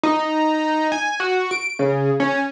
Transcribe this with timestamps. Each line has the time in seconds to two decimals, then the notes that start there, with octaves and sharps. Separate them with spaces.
0.03 D#4
0.92 G#5
1.20 F#4
1.51 D7
1.79 C#3
2.20 C#4